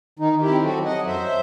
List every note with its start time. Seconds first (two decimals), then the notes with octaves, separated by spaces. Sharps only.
0.19 D#3 D#4
0.33 D#3
0.41 E4 G4
0.48 C4
0.63 F#3 F#4 A4
0.77 F#3
0.85 D#5 F#5
0.92 F#3
1.06 F#2 C5 E5